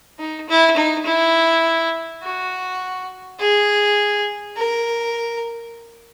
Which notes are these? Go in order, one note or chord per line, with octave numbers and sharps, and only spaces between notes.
D#4
E4
D#4
E4
F#4
G#4
A#4